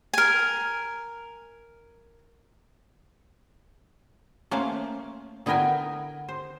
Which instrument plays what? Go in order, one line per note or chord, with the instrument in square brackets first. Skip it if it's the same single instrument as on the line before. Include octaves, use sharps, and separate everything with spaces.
[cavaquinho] A#4 G#5
[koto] A3 A#3 C#4 C5 F5
D3 B3 E4 A#4 G5 G#5
C5